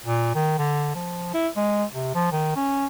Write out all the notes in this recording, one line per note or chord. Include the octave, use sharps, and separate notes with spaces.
A#2
D#3
D3
F3
E4
G#3
C3
F3
D#3
C#4